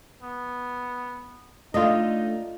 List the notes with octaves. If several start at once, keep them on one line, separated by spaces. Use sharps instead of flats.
B3
A3 D4 D#4 F4 D#5